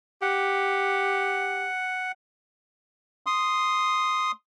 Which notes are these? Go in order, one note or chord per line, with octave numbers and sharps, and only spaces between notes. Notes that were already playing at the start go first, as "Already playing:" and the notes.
G4 F#5
C6 D#6